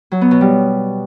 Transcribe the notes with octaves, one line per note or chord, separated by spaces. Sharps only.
F#3
B3
B2
G3